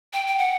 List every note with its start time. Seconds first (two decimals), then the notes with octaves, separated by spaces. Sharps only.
0.13 G5
0.27 G5
0.38 F#5